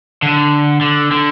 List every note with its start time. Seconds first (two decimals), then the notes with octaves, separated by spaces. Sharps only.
0.22 D3
0.81 D3
1.12 D3